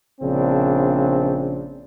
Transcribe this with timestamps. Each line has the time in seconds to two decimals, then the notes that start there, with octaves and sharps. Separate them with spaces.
0.21 A#1 C#3 C4 D4